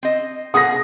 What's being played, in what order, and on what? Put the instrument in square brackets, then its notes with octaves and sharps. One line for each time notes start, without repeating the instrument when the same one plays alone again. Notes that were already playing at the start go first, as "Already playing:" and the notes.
[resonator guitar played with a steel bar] C4 D#5
[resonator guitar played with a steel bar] B2 G#4 F#5 [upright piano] D#6 A#6